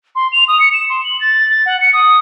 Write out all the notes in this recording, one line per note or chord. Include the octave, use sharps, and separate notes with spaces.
C6
F7
D#6
C#7
E7
C6
F#7
A6
A6
F#5
C#7
D#6